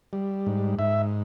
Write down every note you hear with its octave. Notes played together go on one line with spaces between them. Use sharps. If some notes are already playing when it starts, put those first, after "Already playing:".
G3
G#2
G#2 E5